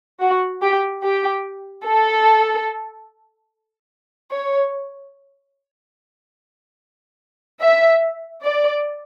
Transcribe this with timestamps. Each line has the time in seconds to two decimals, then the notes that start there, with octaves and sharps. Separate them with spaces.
0.21 F#4
0.62 G4
1.03 G4
1.86 A4
4.32 C#5
7.61 E5
8.43 D5